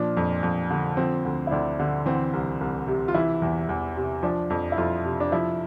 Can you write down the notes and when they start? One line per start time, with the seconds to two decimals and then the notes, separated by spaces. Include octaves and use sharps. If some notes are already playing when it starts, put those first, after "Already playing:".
Already playing: A#2 F3 D4
0.17 F2
0.43 F2
0.70 D3
0.97 F3 C4
1.25 D2
1.47 E4
1.51 D2 D4
1.80 D3
2.06 E3 C4
2.33 C2
2.61 C2
2.87 C3
3.08 F4
3.14 E3 E4
3.42 E2
3.69 E2
3.96 C3
4.23 F3 D4
4.50 F2
4.72 E4
4.78 F2 F4
5.05 C3
5.20 D4
5.32 F3 E4